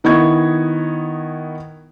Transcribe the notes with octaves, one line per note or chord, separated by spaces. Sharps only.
D#3 B3 E4 D#5 C#6 G#6